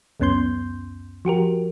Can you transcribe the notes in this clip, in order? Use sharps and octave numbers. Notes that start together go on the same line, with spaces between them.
C#2 F#2 B3 C#4 C6 G6
F3 F#4 G4 A#4